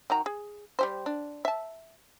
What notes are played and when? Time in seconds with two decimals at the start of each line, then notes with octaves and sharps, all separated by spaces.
0.10 D#3 F#4 A#5
0.26 G#4
0.79 G3 G4 C5
1.06 D4
1.45 E5 A5